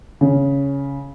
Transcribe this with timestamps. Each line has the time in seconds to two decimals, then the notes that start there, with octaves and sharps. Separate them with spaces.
0.21 C#3